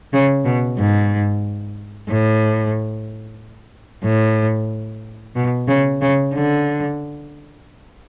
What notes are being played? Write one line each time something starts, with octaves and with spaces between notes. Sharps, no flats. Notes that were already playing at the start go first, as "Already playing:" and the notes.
C#3
B2
G#2
A2
A2
B2
C#3
C#3
D3